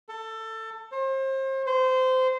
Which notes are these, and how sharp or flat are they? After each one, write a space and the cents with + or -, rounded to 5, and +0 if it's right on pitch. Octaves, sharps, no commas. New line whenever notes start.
A4 +20
C5 +35
C5 -20